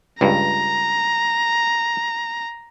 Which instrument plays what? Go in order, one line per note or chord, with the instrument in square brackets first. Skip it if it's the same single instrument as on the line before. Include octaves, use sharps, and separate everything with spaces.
[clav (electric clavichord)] C#2 G2 [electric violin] A#5